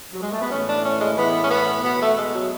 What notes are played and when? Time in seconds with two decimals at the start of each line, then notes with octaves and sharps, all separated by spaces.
0.13 F#3
0.21 G#3
0.31 A3
0.41 B3
0.50 A2 E3 C#4
0.66 D4
0.83 C#4
0.99 G#3
1.16 A2 E3 B3
1.41 C#4
1.50 B3
1.83 B2 B3
2.00 A3
2.17 G#3
2.34 F#3